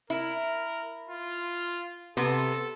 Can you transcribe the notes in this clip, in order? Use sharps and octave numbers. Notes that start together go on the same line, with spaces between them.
E4 A#4
F4
C3 B3 A4